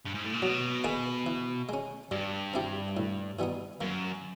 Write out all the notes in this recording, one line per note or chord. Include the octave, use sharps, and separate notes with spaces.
G2
G#2
A2
A#2
B2 F#3
A#3 D#4 G#4 B4
E3
G#3 C#4
G2 G3
C4 E4 G4
A2
E3 G3 B3 D#4
F#2 A#3